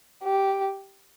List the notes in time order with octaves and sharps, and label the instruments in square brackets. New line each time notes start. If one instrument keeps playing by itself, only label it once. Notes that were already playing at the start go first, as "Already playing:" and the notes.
[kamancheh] G4